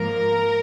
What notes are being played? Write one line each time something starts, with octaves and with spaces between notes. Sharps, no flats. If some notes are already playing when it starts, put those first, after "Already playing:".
Already playing: G#2 F3 A#3 A#4